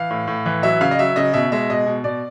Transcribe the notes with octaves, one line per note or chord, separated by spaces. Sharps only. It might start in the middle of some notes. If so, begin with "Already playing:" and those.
Already playing: E3 F5
A2
A2
E3
F#3 E5
C#3 F5
D#5
F#3 E5
C#3 D#5
B2 E5
G#3 E5
B2 D#5
B2
B2 D5